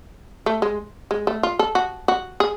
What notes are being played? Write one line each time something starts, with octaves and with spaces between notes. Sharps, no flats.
A3
G#3
G#3
A3
F4
A4
F#4
F#4
G#4